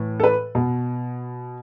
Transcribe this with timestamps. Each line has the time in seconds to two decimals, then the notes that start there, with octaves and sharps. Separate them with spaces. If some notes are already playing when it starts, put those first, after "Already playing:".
Already playing: A2 E3
0.20 A4
0.24 B4
0.55 B2